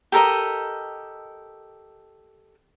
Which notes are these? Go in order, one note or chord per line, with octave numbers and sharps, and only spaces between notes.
G4 A4 A#4 D#5